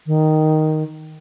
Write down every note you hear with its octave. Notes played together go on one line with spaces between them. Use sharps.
D#3